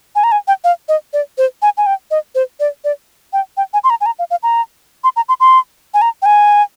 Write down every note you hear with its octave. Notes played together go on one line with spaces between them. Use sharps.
G#5
A#5
G#5
G5
F5
D#5
D5
C5
G#5
G#5
G5
D#5
C5
D5
D5
G5
G5
G#5
C6
A#5
G#5
A#5
F5
F5
A#5
C6
A#5
C6
C6
G#5
A#5
G5
G#5